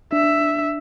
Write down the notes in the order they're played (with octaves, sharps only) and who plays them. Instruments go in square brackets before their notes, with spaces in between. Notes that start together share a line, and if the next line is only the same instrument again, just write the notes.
[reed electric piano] D4 [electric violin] E5